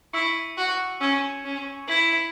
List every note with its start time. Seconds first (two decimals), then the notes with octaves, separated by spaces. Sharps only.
0.13 E4 C#6 E6 C#7
0.57 F#4
1.01 C#4 E6 G#6 E7
1.45 C#4
1.88 E4 G#6 B6 F#7